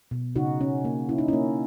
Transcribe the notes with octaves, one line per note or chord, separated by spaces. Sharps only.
B2
C#3 D#4 F#4
C#4
A#3
C#4 E4
D#4
A#3 C#4 E4